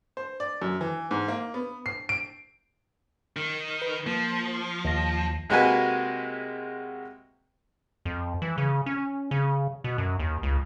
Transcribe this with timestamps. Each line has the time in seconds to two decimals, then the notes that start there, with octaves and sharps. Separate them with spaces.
0.17 C5
0.40 D5
0.62 F#2
0.81 E3
1.11 G#2
1.28 A#3
1.54 B3
1.86 C7
2.09 D7
3.36 D#3
3.82 B4
4.06 F3 A#3
4.85 D#2 A#6
5.50 C3 G#3 A#3 F#4 B4 G#5
8.05 F2
8.42 E3
8.58 C#3
8.86 C#4
9.31 C#3
9.84 B2
9.98 F#2
10.19 D#2
10.43 C#2